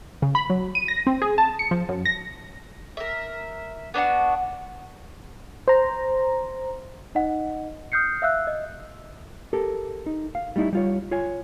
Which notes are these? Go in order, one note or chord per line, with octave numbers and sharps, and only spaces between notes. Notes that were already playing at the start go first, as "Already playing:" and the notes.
C#3
B5
F#3
D#7
A#6
C4
G#4
A5
C#7
F3
F#2
A#6
A#4 E5
B3 D4 D#4 F#4
C5 A#5
D#4 D#5 F#5
D#6 F6 G6 C7 C#7
E5 F5 E6 F#6
D#5
G4 A4 A#4
D#4
F5
G3 A3 D#4 E4
G3 F4 C#5
F4 C#5 G#5